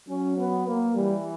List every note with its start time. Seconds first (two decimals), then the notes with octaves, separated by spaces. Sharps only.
0.09 F#3 C#4
0.38 B3
0.67 A#3
0.95 E3 G3